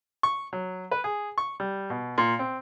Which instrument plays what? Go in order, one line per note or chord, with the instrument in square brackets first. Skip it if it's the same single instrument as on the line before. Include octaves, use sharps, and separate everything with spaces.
[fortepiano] C#6
F#3
B4
G#4
C#6
G3
B2
A#2
C4